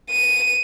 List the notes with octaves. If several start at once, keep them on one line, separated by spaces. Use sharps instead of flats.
D#7